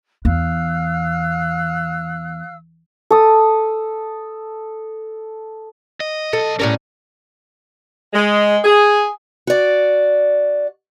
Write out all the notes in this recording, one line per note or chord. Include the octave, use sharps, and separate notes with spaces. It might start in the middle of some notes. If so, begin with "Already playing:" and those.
E2 F5 E6 F#6
A4 D#6
D#5
B1 A4 D#5
A2 G3 C#4 A#4
G#3
G#4
F#4 D5